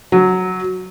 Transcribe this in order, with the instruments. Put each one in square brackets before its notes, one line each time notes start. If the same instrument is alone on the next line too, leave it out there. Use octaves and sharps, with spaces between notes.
[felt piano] F#3